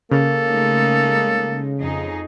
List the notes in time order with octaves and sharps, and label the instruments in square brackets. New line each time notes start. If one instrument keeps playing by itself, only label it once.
[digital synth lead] C#3 [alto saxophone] A#3 [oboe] A4
[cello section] G#3 A3 D#4
F2 D#4 G#4